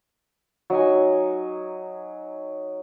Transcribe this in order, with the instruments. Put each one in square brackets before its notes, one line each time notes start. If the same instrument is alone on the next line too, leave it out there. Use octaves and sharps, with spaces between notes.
[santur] F#3 D#4 G#5